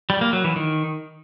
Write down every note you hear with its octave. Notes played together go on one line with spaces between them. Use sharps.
G3
A#3
F#3
E3
D#3